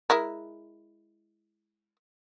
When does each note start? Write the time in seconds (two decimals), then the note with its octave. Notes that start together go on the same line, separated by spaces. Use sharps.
0.10 G#3 E4 A#4